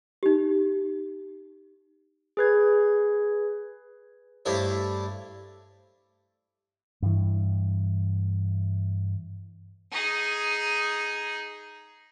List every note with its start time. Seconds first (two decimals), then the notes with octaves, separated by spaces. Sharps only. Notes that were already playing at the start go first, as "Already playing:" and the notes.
0.23 D#4 G4
2.37 G#4 B4 G#6
4.45 G2 A3 D4 E4 C5 C#5
7.02 G2 E3
9.92 D#4 G#4